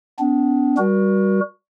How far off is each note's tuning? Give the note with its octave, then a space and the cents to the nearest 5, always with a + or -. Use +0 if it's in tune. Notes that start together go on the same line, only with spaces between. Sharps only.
B3 +30 D4 -30
G3 +0 F#4 +0 A#4 +35